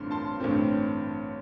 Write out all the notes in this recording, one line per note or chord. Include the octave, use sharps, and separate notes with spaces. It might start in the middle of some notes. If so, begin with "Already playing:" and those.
Already playing: A1 G2 D3 C4 C6
A5 C6
A1 G2 D3 A3 C4